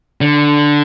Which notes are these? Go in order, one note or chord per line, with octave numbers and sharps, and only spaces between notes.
D3